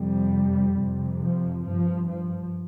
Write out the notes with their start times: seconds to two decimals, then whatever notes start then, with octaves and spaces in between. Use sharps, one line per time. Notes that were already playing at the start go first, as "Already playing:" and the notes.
Already playing: F2 C3 G3
0.78 F2 C3
1.22 F3
1.65 G2 F3
2.09 F3